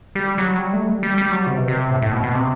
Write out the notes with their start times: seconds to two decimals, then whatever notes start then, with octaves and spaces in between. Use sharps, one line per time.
0.15 G3
0.38 F#3
0.58 G3
0.73 A3
0.88 G3
1.03 G3
1.18 G3
1.32 F#3
1.47 C3
1.57 B2
1.68 C3
1.91 A2
2.02 A2
2.12 B2
2.23 B2
2.34 C3